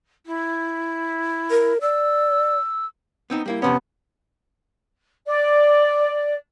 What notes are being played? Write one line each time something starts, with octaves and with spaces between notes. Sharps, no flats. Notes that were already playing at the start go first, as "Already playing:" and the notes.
E4
A#4
D5 E6
B3 C4 D#4
G3 A#3 E4
F2 C3 B3 C#4
D5